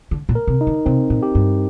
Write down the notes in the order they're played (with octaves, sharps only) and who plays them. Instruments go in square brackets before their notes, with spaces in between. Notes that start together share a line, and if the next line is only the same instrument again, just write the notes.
[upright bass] D3
A#2
[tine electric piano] A#4
[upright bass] C3
[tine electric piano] D#4
[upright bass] D3
[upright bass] C3 [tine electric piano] C4
[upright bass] A#2
[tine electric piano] G4
[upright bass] G2